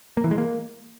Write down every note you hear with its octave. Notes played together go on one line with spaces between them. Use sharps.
A#3
E3
G#3
A#3